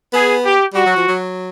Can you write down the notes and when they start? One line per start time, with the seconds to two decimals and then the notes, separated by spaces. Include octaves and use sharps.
0.13 B3 G#4
0.44 G4
0.74 G3 F#4
0.86 F#3
0.97 F3
1.08 F#3